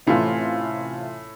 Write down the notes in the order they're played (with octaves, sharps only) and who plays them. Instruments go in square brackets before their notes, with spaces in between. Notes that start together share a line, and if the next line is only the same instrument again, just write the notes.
[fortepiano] A2 [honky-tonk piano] C3 E3 A3 C#4 F4